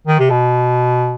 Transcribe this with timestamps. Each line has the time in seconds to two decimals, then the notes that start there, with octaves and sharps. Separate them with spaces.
0.07 D#3
0.19 C3
0.30 B2